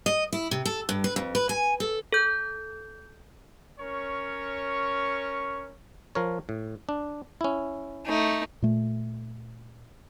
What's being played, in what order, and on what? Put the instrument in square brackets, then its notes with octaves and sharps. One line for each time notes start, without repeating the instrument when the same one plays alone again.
[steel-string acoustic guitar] D#5
E4
C3
A4
G2
B4
F2
B4
G#5
A4
[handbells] A4 G6
[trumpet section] C#4 A#4 C#5 C#6
[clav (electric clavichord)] F3 A#4 C#5
A2
D4
C#4 E4
[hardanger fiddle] A3 D#4
[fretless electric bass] A#2 A3